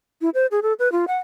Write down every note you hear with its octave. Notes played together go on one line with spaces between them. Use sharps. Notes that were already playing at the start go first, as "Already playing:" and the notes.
E4
C5
G#4
A4
B4
F4
F#5